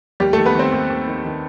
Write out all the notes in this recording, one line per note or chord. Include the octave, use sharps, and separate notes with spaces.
D#2 G3 G4
D#3 A3 A4
B3 B4
D#3 C4 C5
D#2
D#2
D#3
D#3